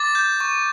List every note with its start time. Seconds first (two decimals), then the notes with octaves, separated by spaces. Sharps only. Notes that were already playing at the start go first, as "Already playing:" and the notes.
Already playing: D6 A6
0.15 G6
0.40 C#6